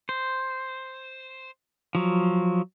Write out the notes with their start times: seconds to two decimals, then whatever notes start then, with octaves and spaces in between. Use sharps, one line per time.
0.09 C5
1.95 F3 F#3